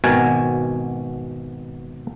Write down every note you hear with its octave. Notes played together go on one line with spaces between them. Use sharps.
G#1 B2 C4 F#4 A#4 G#5